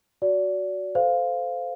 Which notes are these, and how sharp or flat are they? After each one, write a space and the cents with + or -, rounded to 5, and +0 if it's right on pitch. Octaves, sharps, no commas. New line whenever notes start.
F#4 +0 D5 -30
A4 +0 C5 -15 F5 +0